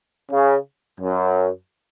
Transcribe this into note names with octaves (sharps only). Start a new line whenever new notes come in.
C#3
F#2